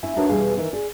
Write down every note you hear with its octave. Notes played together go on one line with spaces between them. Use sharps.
C#4 E4 E5 G#5
D4 D#4 F#4 A#4 B4 C#5
E2 B2 E3 G3 G#4 F5
D#3 E3 D#4
G#4 D5